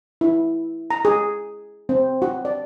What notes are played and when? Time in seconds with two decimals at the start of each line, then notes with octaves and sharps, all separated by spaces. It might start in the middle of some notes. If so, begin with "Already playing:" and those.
0.21 E4
0.90 A#5
1.05 G#4
1.89 C4
2.22 F#4
2.45 D5